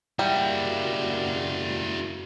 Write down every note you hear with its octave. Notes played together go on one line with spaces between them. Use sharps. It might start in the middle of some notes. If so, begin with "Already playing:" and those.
F#2 C#3 G3 A#3 E4 F#4